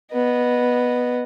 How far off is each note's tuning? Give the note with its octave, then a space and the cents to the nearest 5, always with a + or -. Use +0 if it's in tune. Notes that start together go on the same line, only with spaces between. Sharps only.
B3 -5 D#5 -20